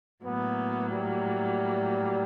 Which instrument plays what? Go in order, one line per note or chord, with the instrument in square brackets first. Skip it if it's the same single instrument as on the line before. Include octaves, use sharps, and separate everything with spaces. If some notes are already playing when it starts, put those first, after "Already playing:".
[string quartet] A2 F#3 A#3 [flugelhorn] B3
[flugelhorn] G3